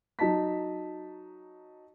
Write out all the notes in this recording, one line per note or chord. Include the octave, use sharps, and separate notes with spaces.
F#3 D#4 A5 B6